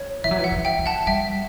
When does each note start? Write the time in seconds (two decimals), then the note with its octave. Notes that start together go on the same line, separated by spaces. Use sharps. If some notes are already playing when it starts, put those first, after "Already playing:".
Already playing: C#5
0.24 E3 E5
0.31 F#3
0.38 E3
0.44 F#5
0.52 D3
0.65 E5 G5
0.79 E3
0.86 F#5 A5
1.07 G3 E5 G5